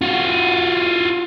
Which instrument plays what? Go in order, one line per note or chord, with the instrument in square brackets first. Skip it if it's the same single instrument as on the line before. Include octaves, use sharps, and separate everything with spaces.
[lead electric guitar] F4 F#4